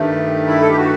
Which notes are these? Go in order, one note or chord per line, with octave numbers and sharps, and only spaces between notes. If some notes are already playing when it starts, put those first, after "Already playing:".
Already playing: G2 D#3 A3
E4
A4
G4
F#4